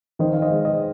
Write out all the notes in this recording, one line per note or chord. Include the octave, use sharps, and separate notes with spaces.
D#3 C5 D#5
F5
C5 D#5
G#3
C5 D#5